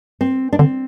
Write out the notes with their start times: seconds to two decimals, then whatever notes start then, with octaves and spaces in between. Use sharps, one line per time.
0.21 C4
0.53 D4
0.59 D3 C4